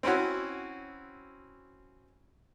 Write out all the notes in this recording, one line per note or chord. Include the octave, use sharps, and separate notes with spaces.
C4 C#4 E4 F#4